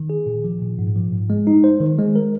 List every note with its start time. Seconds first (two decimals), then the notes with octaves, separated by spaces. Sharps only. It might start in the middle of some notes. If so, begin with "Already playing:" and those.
Already playing: D#3
0.10 G#4
0.27 A#2
0.44 F3
0.62 A#2
0.79 G#2
0.96 F3
1.12 G#2
1.30 G#3
1.47 D#4
1.64 C5
1.80 D#3
1.98 G#3
2.16 A#4